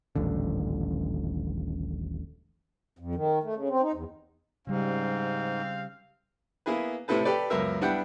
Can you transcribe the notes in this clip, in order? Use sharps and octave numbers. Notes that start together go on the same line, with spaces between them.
D#1 A1 D3
F2
D#3
A3
C#3
C4
D#4
E2
G#2 C#3 G3 C4 F5
A#3 B3 E4 G#4 B4
A2 C3 E4 A4 B4 A5
G4 A4 B4 D5
C#2 F#2 B3 A#4 E5
G3 B3 D4 E4 F#5 G5